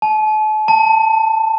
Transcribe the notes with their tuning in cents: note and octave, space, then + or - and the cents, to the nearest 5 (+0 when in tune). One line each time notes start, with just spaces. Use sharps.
A5 -40
A5 +20